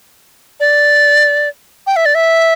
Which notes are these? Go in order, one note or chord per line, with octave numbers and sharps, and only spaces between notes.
D5
G5
E5
D5
E5